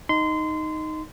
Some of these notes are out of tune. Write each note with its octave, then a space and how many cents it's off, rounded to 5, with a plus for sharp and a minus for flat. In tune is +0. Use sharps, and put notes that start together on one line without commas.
D#4 +0 C6 -25